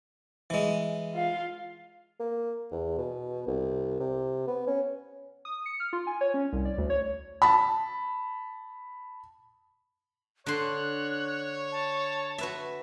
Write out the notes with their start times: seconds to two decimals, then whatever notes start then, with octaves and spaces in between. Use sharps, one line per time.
0.50 E3 G#3
1.15 F4 F5
2.19 A#3
2.71 E2
2.98 B2
3.47 C2
4.00 C3
4.47 B3
4.67 C#4
5.45 D#6
5.66 C#7
5.80 F6
5.93 F4
6.07 G#5
6.21 C#5
6.34 C#4
6.53 C2
6.65 D5
6.78 D2
6.90 C#5
7.42 A5 B5
10.46 D3 C#5 C6 F#6
11.72 A5
12.38 F#4 B4 E5